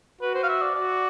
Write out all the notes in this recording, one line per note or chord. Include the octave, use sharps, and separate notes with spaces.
F#4 B4
C5
F5
E5
D5
F#4 D5